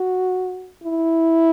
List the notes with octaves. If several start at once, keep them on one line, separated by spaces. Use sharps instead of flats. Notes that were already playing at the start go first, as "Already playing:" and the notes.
Already playing: F#4
E4